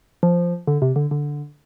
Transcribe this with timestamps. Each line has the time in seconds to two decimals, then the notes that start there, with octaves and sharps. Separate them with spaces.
0.23 F3
0.67 D3
0.82 C3
0.96 D3
1.11 D3